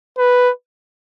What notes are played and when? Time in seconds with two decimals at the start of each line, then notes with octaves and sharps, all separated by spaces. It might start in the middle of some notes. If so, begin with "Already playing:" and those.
0.18 B4